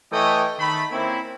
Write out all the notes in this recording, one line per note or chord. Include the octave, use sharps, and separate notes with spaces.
E3 A3 C#5 D#5 G5 G#5
D#3 A3 B5
A#3 C4 C#4 E4